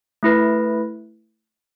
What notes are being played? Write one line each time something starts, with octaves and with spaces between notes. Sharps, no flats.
A3 E4 B4